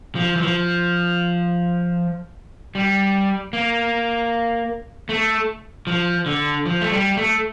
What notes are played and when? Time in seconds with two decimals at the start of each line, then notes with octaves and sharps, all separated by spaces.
0.15 F3
0.36 E3
0.42 F3
2.75 G3
3.53 A#3
5.09 A3
5.87 F3
6.26 D3
6.66 F3
6.81 A3
6.92 G3
7.17 A3